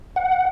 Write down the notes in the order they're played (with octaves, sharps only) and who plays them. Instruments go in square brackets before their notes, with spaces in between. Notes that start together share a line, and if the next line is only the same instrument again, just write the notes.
[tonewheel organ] F#5